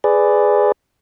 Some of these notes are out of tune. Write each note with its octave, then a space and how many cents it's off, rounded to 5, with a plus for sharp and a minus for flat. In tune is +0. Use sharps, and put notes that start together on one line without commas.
G#4 +0 B4 +15 D5 +0